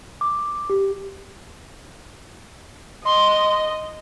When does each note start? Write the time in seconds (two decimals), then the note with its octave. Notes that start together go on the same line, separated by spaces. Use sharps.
0.21 D6
0.70 G4
3.06 D#5 C6